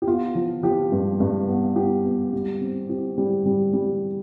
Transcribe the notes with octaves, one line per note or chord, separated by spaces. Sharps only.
G4
B3 F4
F3
F3 G4
G2
G2
B3
B3 G4
B3
G3
C4
C4 G4
G3
G3
G3